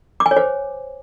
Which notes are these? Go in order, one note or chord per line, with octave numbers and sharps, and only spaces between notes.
D6
G#5
C#5
C5